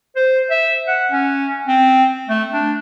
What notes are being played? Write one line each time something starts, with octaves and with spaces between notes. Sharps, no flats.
C5
E5
F#5
C#4
C4
A3
D4